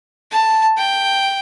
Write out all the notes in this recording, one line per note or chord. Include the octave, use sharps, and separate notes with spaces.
A5
G5